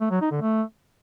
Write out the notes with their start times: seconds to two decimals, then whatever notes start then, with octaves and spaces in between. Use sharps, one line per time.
0.01 A3
0.11 F#3
0.21 D#4
0.31 D3
0.41 A3